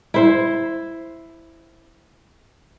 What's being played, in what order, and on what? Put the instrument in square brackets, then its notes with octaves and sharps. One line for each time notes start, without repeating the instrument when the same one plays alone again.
[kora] E4 C5